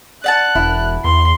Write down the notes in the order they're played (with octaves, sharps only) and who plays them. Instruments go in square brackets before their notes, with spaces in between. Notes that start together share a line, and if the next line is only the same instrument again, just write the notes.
[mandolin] D5 F#5 A5 [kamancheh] F#6
[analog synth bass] E1 [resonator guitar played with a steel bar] E4
[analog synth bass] E2 [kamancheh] C6